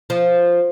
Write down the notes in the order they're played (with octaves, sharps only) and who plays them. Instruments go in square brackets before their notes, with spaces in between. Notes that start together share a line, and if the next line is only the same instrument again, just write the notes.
[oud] F3